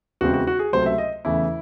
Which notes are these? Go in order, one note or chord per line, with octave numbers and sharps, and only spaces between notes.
E2 C#3 G#3 C4 F#4
F#4
F#4
G#4
C#2 C3 F#3 A3 C5
E5
D#5
E2 C#3 E3 A3 E4